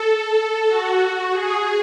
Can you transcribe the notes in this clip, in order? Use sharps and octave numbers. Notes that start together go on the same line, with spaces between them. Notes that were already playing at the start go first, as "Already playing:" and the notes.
Already playing: A4
F#4
G#4